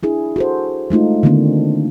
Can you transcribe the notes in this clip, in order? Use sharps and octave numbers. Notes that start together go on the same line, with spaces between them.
D4 E4 G#4
F#4 A4 C5
G#3 A3 D#4 F4
D3 D#3 A3 A#3 C4 D4